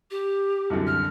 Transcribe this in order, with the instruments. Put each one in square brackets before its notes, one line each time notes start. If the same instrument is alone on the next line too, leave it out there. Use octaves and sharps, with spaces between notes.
[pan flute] G4
[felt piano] C2 F#2 D3
[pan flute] F6